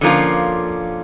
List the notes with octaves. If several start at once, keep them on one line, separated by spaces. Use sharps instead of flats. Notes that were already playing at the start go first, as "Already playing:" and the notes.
D3 F3 A#3 C#4 F4